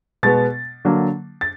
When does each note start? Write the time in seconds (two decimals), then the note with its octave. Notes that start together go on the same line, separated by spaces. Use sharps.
0.23 B2 G#3 B3 A6
0.85 D3 F#3 A#3
1.41 A6